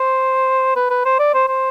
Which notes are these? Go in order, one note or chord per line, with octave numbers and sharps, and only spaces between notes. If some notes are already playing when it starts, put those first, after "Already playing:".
Already playing: C5
B4
B4
C5
D5
C5
C5